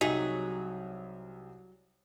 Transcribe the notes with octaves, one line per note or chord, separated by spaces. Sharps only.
C2 F#3 D#4 G4 G#4 B6